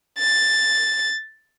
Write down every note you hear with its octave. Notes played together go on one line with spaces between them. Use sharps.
A6